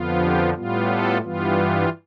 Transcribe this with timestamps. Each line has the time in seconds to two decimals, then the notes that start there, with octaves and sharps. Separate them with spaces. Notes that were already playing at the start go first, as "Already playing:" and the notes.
Already playing: F2 D3 F3 B3 F4
0.20 G4
0.54 A2 G3 B3 F4
0.87 A4
1.22 G2 E3 G3 B3 F4